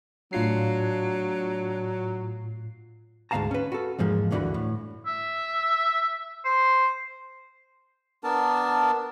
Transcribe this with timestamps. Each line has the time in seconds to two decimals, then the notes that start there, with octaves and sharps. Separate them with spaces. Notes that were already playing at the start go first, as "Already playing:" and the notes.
0.33 A2 F#3 D4 F4 C7
3.31 D2 G#2 B3 F5 A5 A#5
3.51 C#4 B4
3.72 F#4 A4
3.99 E2 G#2 F3 G#3 A#3
4.31 D2 G2 D3 E3 F#4 B5
4.54 A2
5.06 E5
6.45 C5
8.24 B3 D4 A#4 A5